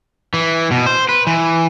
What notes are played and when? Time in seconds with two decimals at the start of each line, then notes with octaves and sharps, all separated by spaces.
0.34 E3
0.71 B2
0.86 C5
1.09 B4
1.27 E3